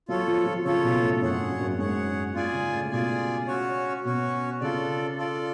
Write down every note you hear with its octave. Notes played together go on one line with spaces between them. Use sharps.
F#3 F4 A4 C#5
F3
F3
C#3 F4 A4 C#5
B2
A2
F#2 G#4 C#5 F#5
F#2
F#2
G#2 G#4 C#5 F#5
G#2 F4 G#4 D5 G#5
C#3
A2
B2 F4 G#4 D5 G#5
C#4 F#4 C#5
B2 C#4 F#4 C#5
C#3 F4 A4 D5
F4 A4 D5